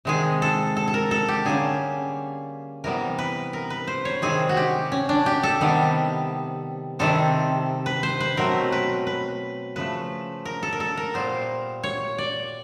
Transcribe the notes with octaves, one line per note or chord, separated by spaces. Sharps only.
C3 D#3 G#3 G#4
A4
A4
A4
A#4
A4
G4
D3 G3 A#3 C#4 G#4
C3 E3 G3 B3 A#4
B4
A#4
B4
C5
C#5
C3 D#3 G3 C4 G#4
F#4
G4
C#4
D4
G4
A4
C3 D#3 G3 B3
C3 D#3 G3 C4 A4
B4
C5
B4
B2 F#3 A3 C4 A#4
B4
B4
C#3 F3 A3 B4
A#4
A4
A#4
A4
A#4
A#2 G3 B3 C5
C#5
D5